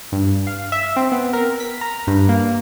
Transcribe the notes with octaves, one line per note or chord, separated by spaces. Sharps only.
G2
F5
E5
C4
B3
A#4
B6
A#5
G2
A#3